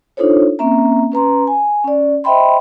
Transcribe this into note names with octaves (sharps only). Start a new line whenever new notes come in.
D4 D#4 F4 A4 C5 C#5
A#3 C4 C#4 E5 A#5
C#4 B4 A#5 C6
G#5
C#4 D5
C5 D#5 E5 G5 B5 C6